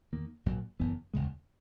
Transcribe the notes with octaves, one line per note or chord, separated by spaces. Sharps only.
E2 D#3 A#3
A#1 G#2 F#3 A#3
F#1 F#2 E3 B3
E1 D#2 C#3 G#3